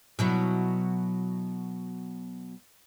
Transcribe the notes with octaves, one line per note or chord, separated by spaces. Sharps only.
B2 F#3 E4